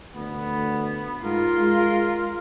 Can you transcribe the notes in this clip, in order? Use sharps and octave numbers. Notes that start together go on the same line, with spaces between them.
D2 B3
G#2 F4 A#4
G#3